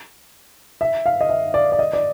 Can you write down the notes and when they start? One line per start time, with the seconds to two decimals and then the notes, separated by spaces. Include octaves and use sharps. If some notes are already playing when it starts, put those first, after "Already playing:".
0.81 E5
1.06 F5
1.21 D#5
1.29 E5
1.54 D5
1.72 D5
1.79 D#5
1.93 D5